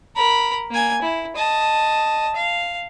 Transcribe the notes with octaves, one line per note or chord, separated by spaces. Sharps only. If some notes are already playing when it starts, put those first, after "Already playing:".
A#4 B5
A#3 G#5
E4
D#5 A5
F5